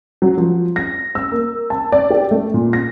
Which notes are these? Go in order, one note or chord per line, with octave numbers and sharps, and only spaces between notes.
F#3
F3
A#6
E6
A#3
A5
D5
G4
A3
A#2
A#6